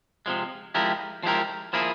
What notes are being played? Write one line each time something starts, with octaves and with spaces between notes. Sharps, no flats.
C3 F3 G#3
F3 G#3 E4 G4 A#4
F3 G#3 E4 G4 A#4
F3 A#3 E4 G#4